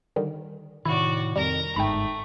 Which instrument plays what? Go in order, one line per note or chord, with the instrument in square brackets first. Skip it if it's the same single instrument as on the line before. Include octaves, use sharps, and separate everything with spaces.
[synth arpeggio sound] D3 D#3 G3
[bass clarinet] A2 [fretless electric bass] C3 D#3 [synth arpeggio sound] E4 [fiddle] F#4 D5
[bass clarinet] F2 [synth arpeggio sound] G3 [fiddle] A#4 A#5
[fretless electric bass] G1 G#2 [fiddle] A3 [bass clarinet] D#4 [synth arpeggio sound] G5 B5